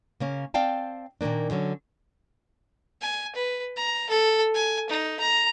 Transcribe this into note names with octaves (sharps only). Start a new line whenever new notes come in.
C#3 A#3 C#4
C4 D5 F5 G5 A5
A#2 D#3 F#3 A#3 D4
D3 F#3 C#4
G#5
B4
A#5
A4
G#5
D#4
A#5